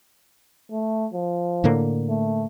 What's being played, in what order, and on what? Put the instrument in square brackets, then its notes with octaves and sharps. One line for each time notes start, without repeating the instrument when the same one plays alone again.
[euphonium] A3
F3
[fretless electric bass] A2 D3 A#3
[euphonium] A3